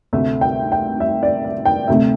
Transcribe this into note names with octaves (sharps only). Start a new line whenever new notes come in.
D2 C3 A3 E5
G5
G5
E5
D5
E5
G5
D2 C3 A3 E5